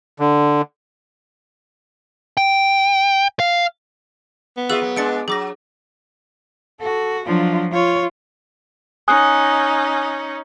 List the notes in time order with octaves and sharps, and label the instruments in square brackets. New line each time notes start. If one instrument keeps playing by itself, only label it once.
[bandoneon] D3
[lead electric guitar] G5
F5
[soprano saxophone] B3
[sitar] F4 F#4 E5 [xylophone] G#4 E6 F#6
[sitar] F#3
[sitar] G#3 D4 [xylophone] A6 C#7 D7
[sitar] F#3 [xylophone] G#4 D6 A#6
[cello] F#4 [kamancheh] A4
[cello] F3 F#3 [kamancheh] D4 F4
[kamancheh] F4 [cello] C#5
[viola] C#4 D#4 [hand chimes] G#5 D#6 F#6